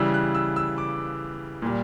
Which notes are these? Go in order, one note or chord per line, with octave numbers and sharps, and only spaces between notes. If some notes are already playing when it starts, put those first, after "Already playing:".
Already playing: C#3 E3 G3 E6
F#6
E6
E6
D6
A#2 G3